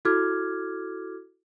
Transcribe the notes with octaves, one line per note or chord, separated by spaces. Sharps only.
E4 F#4 A4 D6 F6 G#6